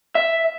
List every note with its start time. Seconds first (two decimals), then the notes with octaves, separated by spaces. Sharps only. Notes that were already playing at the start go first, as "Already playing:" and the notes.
0.15 E5